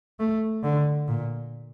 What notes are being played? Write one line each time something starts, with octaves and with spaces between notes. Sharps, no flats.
A3
D3
A#2